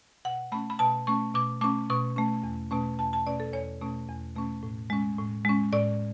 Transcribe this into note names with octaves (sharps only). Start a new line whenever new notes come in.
B2 F#5
A3 C#4 B5
B5
B2 A5
A3 C#4 C#6
B2 D6
A3 C#4 D6
B2 C#6
A3 C#4
E2
B2 A3 C#4
E2 A5
A5
B2 A3 C#4 D5
A4
E2 C#5
B2 A3 C#4
E2
B2 A3 C#4
A2
G#3 C#4
A2
G#3 C#4
A2 D5